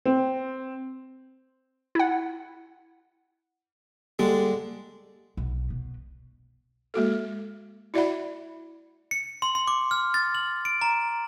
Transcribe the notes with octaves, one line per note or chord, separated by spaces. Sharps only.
C4
E4 F#5
D3 G3 G#3 A#3 D4 G4
B1
B2
G#3 A#3 F#4 A4
E4 F#4 D5 E5 F#5 B5
C#7
C6
C6
D6
F6
A6
F#7
D7
A#5